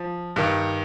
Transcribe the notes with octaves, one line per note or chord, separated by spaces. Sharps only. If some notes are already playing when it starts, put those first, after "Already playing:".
Already playing: F3
G2 D#3